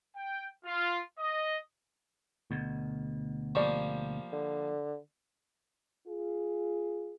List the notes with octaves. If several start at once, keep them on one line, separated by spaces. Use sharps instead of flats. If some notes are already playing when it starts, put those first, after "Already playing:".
G5
F4
D#5
D2 B2
F3 G3 A#3 D5 F5 C#6
D3
F4 G#4